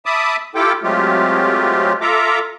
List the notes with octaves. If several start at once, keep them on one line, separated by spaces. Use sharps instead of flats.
E5 A5 B5 D6 D#6
E4 F4 G4 A4 G5 D6
F#3 G#3 A3 C4 F4 G4
F4 A4 E5 A#5 D6